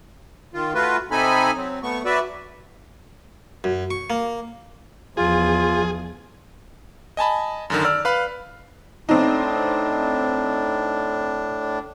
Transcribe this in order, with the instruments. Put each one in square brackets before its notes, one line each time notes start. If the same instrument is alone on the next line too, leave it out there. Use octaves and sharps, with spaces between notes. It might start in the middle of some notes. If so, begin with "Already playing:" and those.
[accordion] D#3 F4
A3 F4 F#4 B4
C3 C4 D#4 A4 G#5 B5
F#3 C4
A3 B3 C#6
F#3 F#4 B4 D5 E5
[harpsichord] F#2
C#6
A#3
[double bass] E2 F3 [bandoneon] F4 [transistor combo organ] G#4
[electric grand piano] D#5 G#5 A5 B5
F#2 D3 D#3
D5 E6 F6
B4 F5 B5
[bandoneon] A2 D4 [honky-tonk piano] C4 D#4